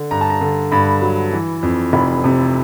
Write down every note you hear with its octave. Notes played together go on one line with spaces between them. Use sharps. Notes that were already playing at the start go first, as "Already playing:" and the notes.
Already playing: D3
G2 A#5
A5
A#5
D3
G2 B5
F#3
E3
F2
F1 B5
C3